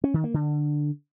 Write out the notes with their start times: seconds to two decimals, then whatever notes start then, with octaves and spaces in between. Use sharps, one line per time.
0.04 C#4
0.14 D#3
0.24 A#3
0.34 D3